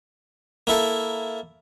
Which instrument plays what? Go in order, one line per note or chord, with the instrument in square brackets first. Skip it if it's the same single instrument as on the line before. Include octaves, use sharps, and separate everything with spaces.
[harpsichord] A#3 E4 A4